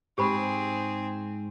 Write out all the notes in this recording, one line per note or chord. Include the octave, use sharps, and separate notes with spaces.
G#2 C4 G4 G#4 C5 B5